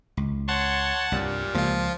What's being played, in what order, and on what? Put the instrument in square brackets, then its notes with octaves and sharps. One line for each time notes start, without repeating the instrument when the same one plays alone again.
[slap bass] C#2
[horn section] C#5 C6 [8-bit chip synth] F#5 A5
[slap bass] C2 G2 [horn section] A#2 G3
[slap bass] C#2 A#3 [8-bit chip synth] F3 F4